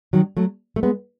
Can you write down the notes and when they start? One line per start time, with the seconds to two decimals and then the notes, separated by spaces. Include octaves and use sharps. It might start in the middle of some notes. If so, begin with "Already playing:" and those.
0.13 D#3 F#3
0.37 F#3 A3
0.76 A3
0.83 G#3 B3